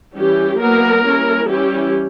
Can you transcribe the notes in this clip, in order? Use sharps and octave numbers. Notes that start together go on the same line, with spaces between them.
E3 G3 C#4 G4
F#3 A#3 B3 E4 A#4
G3 A#3 C#4 E4
E3 G3 C#4 E4 G4